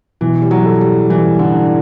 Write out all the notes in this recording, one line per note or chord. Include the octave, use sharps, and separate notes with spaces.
B2 E3
G3
F#3
A4
G3
E3 G3
D3
D4